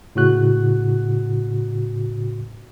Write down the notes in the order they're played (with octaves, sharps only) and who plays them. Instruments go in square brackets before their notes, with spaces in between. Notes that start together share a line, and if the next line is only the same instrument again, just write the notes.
[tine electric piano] A2 C#3 F#4 F#6